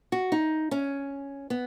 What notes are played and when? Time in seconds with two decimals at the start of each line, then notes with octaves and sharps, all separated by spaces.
0.12 F#4
0.32 D#4
0.71 C#4
1.50 B3